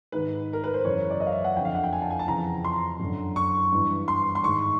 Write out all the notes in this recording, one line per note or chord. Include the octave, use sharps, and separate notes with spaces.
G#2 D#3 B4
A#4
B4
C5
F#2 C#3 E3 C#5
D5
D#5
F5
E5
F#5
F2 D3 F5 G5
F#5
G5
G#5
A5
G#5
A5
F2 C#3 E3 A#5
C6
F#2 D3
C#6
G2 E3
C6
C6
G#2 D#3 C#6